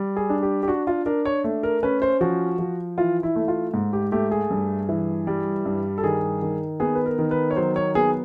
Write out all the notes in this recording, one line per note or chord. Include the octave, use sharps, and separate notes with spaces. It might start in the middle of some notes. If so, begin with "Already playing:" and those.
Already playing: G3
G#4
D4
G4
G4
D4 F#4
F4
D4 A#4
C#5
A3
A#4
C#4 B4
C5
F3 F#4
F3
E3 F4
E4
A3
F4
G#2
G4
A3 G4
G#4
G2
E3
G3
G2
A4
D#3 G#4
D#3
B3 G#4
B4
A#4
D#3
B4
C#5
F#3 C5
C#5
B3 G#4